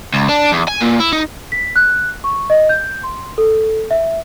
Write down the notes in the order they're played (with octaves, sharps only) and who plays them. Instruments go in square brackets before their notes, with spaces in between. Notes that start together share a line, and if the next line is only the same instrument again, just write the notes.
[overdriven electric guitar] C#2
D4
E2
G#5
A#2
E4
D#4
[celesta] B6
F#6
C#6
D#5
G6
C6
A4
E5